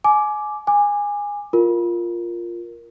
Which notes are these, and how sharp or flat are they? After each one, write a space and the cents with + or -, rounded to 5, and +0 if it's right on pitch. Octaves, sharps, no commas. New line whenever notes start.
G#5 +25 D6 +0
G#5 -15 D6 +15
F4 +0 A#4 +0